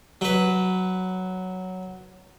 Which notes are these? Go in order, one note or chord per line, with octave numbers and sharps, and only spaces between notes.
F#3 B4